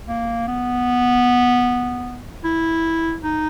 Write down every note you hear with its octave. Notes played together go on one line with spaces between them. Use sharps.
A#3
B3
E4
D#4